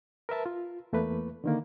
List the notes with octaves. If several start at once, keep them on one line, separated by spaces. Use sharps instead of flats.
A#4 B4 E5 A5
F4
E2 A3 A#3 B4
D3 D#3 A#3